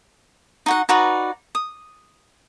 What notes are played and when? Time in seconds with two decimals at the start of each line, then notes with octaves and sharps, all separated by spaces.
0.66 D#4 F#4 F#5
0.89 D#4 F#4 B4 D5
1.55 D#6